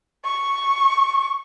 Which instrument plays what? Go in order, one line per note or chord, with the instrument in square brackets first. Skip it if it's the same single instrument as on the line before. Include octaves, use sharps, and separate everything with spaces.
[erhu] C#6